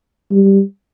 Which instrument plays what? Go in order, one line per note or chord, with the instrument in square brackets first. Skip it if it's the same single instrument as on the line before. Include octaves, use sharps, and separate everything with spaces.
[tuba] G3